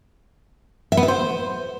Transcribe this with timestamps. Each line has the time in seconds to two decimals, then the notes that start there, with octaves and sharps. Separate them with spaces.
0.92 E5
0.97 B3
1.03 E5
1.08 C5